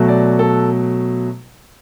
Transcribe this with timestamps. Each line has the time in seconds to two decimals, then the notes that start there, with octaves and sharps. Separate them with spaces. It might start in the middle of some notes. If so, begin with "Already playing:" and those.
Already playing: B2 F#3 A3
0.08 D5
0.39 A4